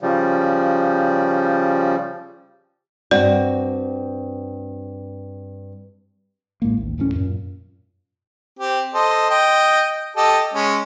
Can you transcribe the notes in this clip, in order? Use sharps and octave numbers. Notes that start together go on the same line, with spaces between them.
C#3 F3 G3
G2 C4 F#4 D5
A#1 A2 G#3 A#3
A1 D#2
D1 E2 A2 C#4
F#2 A#2
C4 G4
A4 C5 D#5
D#5 G5
G4 A4 D#5
G#3 C#4